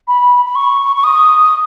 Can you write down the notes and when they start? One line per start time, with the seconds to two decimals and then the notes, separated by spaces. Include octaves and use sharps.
0.08 B5
0.45 B5
0.55 C#6
0.96 C#6
1.04 D#6